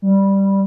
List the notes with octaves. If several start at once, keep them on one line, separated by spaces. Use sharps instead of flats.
G3